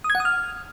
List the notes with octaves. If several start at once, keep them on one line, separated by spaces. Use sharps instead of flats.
D#6
G#6
F#5
D#6
F6